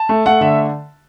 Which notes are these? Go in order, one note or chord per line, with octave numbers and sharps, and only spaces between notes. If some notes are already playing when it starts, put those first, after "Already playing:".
Already playing: A5
A3
A3 F#5
D3 E5